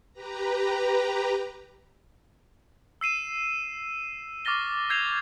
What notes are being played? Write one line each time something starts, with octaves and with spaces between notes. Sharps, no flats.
G4 B4 A#5
E6 C7 D#7 E7
C#6 D6 F6 A6 A#6 G7
E6 G6 G#6 C7 E7 F7